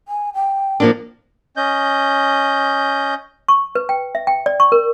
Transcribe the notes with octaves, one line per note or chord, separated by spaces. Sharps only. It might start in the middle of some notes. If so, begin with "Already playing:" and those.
G#5
G5
F3 A#3 D4
C#4 D#5 G6
C#6
B4
G5
E5
G5
D5
C#6
A#4